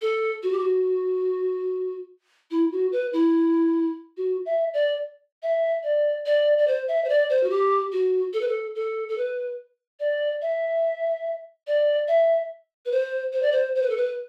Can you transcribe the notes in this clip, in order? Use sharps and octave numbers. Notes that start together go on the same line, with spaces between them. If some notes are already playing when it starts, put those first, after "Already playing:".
A4
F#4
G4
F#4
E4
F#4
B4
E4
F#4
E5
D5
E5
D5
D5
D5
C5
E5
C5
D5
C5
F#4
G4
F#4
A4
B4
A4
A4
A4
B4
D5
E5
D5
E5
B4
C5
C5
D5
C5
C5
B4
A4
B4